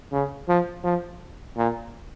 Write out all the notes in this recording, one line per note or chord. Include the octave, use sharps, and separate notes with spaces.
C#3
F3
F3
A#2